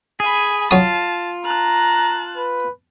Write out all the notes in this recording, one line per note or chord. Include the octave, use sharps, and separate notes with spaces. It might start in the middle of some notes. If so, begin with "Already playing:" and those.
G#4 G#5 B5
F#3 F4 A5 D#6
A5 A#5 F#6
B4